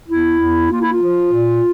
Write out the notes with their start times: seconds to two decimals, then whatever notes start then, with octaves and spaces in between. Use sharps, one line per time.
0.08 E2 E4
0.40 E2
0.70 A#3 F4
0.81 E4
0.92 F4
1.02 F3
1.33 A#2